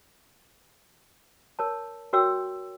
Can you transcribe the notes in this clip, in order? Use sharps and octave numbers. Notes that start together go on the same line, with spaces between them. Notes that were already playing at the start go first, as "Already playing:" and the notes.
A#4 C#5 A5
F#4 A#4 C#5 G5 E6